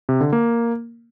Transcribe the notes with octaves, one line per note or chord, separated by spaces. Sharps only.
C3
D3
A#3